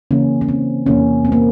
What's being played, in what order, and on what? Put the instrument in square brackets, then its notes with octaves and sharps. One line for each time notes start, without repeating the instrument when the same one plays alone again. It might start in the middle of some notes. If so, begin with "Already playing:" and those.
[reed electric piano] C#3 E3 A#3 [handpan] C#4
[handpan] C#4
C4
[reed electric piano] E2 C3 E3 A#3 [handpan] C#4
[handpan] C4
A#3